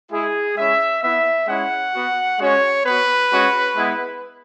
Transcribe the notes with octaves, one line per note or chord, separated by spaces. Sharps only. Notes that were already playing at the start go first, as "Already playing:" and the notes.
G#3 E4 G#4
G#3 C#4 E4 E5
B3 E4 E5
G#3 C#4 E4 F#5
B3 F#4
G#3 C#4 F#4 C#5
B3 F#4 B4
G#3 C#4 F#4
G#3 B3 E4